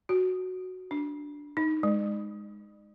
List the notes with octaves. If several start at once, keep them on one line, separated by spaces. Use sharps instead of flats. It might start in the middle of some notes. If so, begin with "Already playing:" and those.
F#4
D4
D#4
G#3